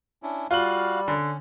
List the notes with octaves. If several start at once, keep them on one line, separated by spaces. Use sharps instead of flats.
C#4 D4 E4
G3 F4 F#4 F5 F#6 F#7
D3 C#4